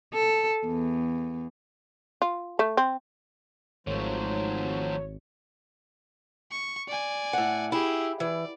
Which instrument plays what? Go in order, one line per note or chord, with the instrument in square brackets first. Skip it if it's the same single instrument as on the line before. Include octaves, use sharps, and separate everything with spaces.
[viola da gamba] A4
E2
[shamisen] F4
A3
C4
[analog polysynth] G#1 [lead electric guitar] D#3 A3 [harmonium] F3 F#3 C5 [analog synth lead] C#5
[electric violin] C#6
D5 G#5
[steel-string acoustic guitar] A2 F#5
[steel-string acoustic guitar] E4 [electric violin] G4 G#4
[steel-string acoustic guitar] E3 [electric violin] D5